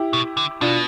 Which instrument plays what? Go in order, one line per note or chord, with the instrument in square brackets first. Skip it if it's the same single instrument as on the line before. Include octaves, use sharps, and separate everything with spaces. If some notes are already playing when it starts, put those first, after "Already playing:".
Already playing: [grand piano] E4 G4
[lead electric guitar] B2
D3
[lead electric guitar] B2 [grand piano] D4 F4